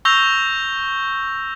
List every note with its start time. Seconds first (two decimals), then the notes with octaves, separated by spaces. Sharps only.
0.05 C#6 E6 G6 A#6 F7